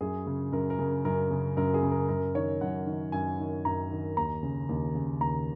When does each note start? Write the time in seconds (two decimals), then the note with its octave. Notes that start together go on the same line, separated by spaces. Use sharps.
0.01 F#2 G#4
0.27 C#3
0.52 F#2 A#4
0.70 A#4
0.79 C#3
1.05 F#2 A#4
1.31 C#3
1.57 F#2 A#4
1.74 G#4
1.83 C#3
1.91 A#4
2.08 F#2 A#4
2.35 D#3 C#5
2.61 F#2 F#5
2.87 D#3
3.12 F#2 G#5
3.39 D#3
3.65 F#2 A#5
3.91 D#3
4.17 D#2 A#5
4.43 C#3
4.69 D#2
4.95 C#3
5.20 D#2 A#5